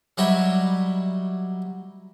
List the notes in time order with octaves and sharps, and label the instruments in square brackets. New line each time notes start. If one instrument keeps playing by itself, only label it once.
[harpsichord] F#3 G3 D#4 E4 C#5 E5